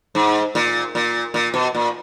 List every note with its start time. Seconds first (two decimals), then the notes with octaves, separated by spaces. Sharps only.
0.15 G#2
0.55 A#2
0.95 A#2
1.34 A#2
1.54 B2
1.75 A#2